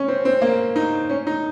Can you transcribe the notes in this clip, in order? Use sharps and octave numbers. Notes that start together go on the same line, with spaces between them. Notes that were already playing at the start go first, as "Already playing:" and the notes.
Already playing: C#4
C4
C4
A#3
D#4
C#4
D#4